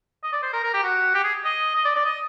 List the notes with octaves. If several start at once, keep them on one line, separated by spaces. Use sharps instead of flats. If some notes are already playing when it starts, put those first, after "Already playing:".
D#5
D5
C5
A#4
A#4
G4
F#4
G4
G#4
D#5
D#5
D5
D5
D#5